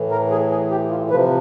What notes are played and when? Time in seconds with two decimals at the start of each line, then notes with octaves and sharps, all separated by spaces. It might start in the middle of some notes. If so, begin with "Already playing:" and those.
Already playing: A2 E3
0.11 A#4
0.31 G#4
0.51 G#4
0.71 G4
0.90 F4
1.10 F3 B4
1.13 C3